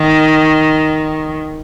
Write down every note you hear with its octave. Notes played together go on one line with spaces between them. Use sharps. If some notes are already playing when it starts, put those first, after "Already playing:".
Already playing: D#3